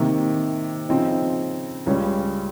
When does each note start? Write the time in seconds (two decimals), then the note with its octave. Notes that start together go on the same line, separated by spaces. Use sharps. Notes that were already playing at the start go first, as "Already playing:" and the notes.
Already playing: C3 D#3 A#3
0.89 C#3 F3 C4 D#4
1.86 C#2 C#3 G3 C#4